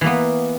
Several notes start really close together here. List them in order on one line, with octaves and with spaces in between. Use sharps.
E3 A#3 B3